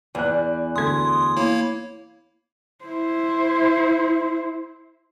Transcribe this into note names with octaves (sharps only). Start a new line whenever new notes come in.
E2 D5 G#5 F#6
D2 A3 C6 D#6 G#6
A#3 E4 C#5
E4 C5